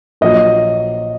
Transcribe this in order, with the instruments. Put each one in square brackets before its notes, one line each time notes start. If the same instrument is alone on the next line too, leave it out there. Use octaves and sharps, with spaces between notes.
[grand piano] A#1 A#2 F#3 D#5